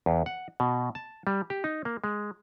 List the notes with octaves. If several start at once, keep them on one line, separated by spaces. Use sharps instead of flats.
E2
F#5
B2
A5
G3
G4
D#4
A#3
G#3